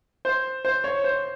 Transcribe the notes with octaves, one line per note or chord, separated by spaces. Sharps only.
C5
C5
C#5
C5